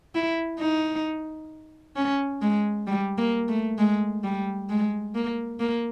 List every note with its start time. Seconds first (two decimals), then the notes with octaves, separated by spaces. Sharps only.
0.15 E4
0.60 D#4
1.96 C#4
2.42 G#3
2.87 G3
3.18 A#3
3.48 A3
3.78 G#3
4.24 G3
4.70 G#3
5.15 A#3
5.60 A#3